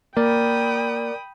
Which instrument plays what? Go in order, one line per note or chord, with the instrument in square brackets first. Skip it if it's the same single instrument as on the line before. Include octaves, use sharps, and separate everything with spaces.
[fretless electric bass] A#3 [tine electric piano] A#4 D5 [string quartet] G5 B5 D#6